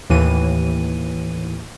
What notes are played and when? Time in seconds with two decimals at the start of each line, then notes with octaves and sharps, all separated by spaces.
0.10 D#2 A2 E3 D#7